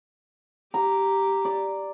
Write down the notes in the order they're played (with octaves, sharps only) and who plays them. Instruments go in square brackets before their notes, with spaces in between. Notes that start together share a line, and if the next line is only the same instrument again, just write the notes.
[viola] G4 [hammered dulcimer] A#5
[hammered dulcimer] D5